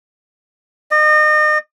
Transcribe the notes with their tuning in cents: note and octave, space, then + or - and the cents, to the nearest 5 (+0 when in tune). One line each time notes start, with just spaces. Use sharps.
D#5 -35